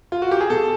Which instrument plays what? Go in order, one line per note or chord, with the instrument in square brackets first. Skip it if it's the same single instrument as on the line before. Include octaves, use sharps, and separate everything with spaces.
[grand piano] F4
F#4
G4
G#4
B2 A4